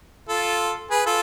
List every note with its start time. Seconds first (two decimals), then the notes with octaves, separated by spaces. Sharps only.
0.29 F4 A4
0.91 G#4 B4
1.06 F4 A4